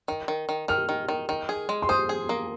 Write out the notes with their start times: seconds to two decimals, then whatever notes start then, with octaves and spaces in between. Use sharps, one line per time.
0.08 D#3
0.28 D#3
0.49 D#3
0.68 D#3 F6
0.89 D#3
1.09 D#3
1.29 D#3
1.49 G#4
1.69 G#3
1.82 C6
1.89 C5 D#6
2.09 G#4
2.29 A#3